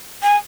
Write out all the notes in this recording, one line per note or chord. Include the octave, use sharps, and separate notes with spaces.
G#5